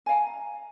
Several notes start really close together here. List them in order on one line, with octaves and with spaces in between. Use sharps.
G#5 F5 A#5